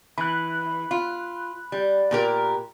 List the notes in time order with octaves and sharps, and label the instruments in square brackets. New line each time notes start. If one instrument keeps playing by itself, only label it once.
[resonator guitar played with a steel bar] E3 [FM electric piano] B5 F#6
[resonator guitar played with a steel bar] F4
G3
A#2 G4 A#4